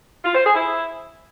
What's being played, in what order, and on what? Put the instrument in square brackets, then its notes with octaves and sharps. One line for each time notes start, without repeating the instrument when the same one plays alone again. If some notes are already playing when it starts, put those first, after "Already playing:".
[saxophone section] F4
C5
G#4
E4